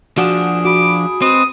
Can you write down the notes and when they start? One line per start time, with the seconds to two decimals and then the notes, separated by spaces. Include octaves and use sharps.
0.18 F3 D4 F#4 G#4 F#5
0.65 F#4 B5 D6
1.22 G#3 C4 B4 D#6